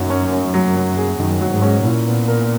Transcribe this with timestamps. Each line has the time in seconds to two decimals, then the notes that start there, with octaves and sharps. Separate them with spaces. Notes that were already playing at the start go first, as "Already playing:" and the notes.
Already playing: F#2 D#3 F#3
0.10 C#4
0.32 C#4
0.54 F#3
0.75 F#3
0.97 G#4
1.19 F#2 D#3
1.41 F#3
1.52 G#2
1.62 C#4
1.84 A#2 E4
2.07 B3
2.28 A#4